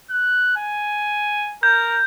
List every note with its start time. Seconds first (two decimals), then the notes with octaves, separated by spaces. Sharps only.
0.10 F#6
0.57 G#5
1.63 A#4 G6